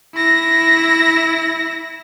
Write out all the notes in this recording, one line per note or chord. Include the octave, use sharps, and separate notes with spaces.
E4 A#6